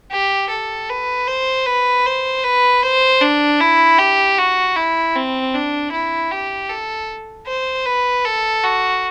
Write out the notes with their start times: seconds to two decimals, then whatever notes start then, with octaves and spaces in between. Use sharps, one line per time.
0.11 G4
0.50 A4
0.89 B4
1.27 C5
1.66 B4
2.06 C5
2.44 B4
2.83 C5
3.21 D4
3.60 E4
3.99 G4
4.38 F#4
4.76 E4
5.16 C4
5.54 D4
5.92 E4
6.31 G4
6.69 A4
7.47 C5
7.86 B4
8.25 A4
8.64 F#4